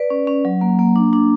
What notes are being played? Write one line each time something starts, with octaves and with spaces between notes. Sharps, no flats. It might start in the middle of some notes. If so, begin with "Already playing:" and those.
Already playing: B4 D5
C#4
C#4
F#3
A#3
A#3
D4
D4